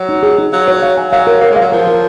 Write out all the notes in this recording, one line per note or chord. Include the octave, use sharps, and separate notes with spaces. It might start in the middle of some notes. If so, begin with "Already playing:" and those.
Already playing: F#3
D#4
G#4
D#4
F#3 F5
C#5
F5
G#5
F#3 F5
A#4
A#3 C#5
G#3
F#3 F5
F3 A#4
A#4